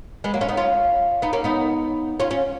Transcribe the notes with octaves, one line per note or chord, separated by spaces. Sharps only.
G#3 B3
F#3 A#3
C#4 F4
B3 D#4
C#4 F4
B3 D#4
A#3 C#4
B3 D#4
C#4 F4
C#4 F4